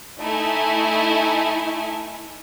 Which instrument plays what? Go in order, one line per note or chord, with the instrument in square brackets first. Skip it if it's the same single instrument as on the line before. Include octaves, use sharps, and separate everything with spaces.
[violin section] A3 D#4 E4 G#5